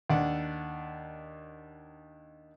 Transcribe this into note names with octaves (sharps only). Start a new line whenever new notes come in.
D#2 D4 F#5